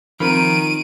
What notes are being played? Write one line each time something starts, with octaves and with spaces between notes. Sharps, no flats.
D#3 F3 C4 A#4 B5 D7 D#7